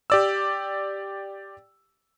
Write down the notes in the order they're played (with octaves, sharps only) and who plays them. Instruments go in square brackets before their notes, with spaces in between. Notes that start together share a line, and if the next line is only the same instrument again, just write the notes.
[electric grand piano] G4 D5 E6